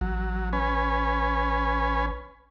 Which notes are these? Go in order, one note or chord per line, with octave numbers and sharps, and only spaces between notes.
A1 F#3
C#4 B4 G#5